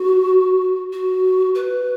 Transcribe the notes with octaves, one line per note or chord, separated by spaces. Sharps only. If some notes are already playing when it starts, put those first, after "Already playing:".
Already playing: F#4
F#4
B4